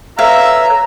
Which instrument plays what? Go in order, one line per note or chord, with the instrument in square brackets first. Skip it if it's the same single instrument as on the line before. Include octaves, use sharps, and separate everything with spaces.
[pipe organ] A4 B4 C#5 [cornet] E5 [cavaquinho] F5 [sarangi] A#5